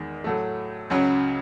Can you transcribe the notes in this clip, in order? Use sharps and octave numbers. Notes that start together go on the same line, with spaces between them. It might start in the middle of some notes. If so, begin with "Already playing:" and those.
Already playing: E2 D#3 G#3
A2 F#3 A3
C#2 C#3 F#3 C#4